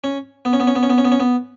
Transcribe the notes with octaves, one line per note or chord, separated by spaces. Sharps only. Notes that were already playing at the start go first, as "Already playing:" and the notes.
C#4
B3
C#4
B3
C#4
B3
C#4
B3
C#4
B3
C#4
B3